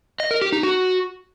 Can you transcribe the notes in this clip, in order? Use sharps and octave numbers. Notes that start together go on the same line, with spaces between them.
D#5
A#4
G4
D#4
F#4